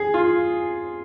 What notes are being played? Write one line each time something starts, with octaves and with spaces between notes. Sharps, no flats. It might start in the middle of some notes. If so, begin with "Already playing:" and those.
Already playing: G#4
F4